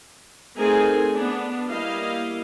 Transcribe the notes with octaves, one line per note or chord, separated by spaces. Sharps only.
A3 C4 D#4 G#4 A#4 G#5
B3 D4
G3 A#3 E4 D#5 F5